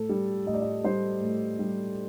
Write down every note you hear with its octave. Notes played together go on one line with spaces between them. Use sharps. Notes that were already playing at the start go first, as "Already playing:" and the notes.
Already playing: A2 A4
G3
A2 D#5
D5
D#5
G3 C5
A2
G3